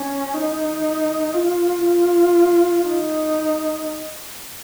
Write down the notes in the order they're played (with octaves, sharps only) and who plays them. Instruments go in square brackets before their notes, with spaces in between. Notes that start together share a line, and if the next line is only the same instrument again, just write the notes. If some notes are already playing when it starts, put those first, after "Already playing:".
Already playing: [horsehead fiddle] C#4
D#4
F4
F4
D#4